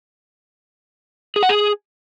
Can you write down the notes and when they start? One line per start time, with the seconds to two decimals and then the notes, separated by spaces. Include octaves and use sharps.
1.36 G#4
1.43 F#5
1.49 G#4